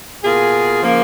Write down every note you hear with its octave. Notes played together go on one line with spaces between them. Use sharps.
B2 A#3 F4 G#4
C#3 F3 A#3